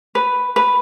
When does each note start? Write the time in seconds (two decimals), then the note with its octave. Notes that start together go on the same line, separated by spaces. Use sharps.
0.15 B4
0.56 B4